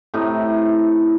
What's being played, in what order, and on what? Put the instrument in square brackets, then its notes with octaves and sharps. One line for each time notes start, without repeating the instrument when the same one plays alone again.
[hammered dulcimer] A2 C3 D#4